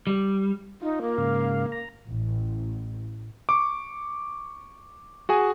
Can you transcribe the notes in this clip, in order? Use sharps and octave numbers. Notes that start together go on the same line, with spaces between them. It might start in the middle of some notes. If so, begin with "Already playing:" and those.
G3
D#4 F4
A#3
G#2 C#3 F5
A#5
A1
C#6 D6
F#4 G#4 G#5